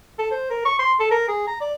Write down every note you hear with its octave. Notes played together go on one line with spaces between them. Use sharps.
A4
C5
A#4
C#6
C6
A4
A#4
G#4
A#5
D5